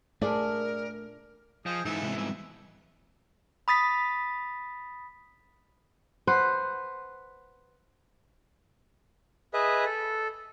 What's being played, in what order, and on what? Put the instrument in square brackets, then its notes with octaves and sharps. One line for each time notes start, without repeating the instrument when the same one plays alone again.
[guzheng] A#2 D4 [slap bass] A3 [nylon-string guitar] G#4 D5 E5 [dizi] A#4
[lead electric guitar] F3 [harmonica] G#4 D#5 G5
[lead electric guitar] G#2 E3 [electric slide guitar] D#4 [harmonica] A4 E5
[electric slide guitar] C3 G#3 C4
[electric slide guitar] G3 B3 C4 [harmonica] E5
[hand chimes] B5 D#6 A6 B6
[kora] B4 C5 F#5
[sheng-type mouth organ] G#4 B4 D#5 E5
A4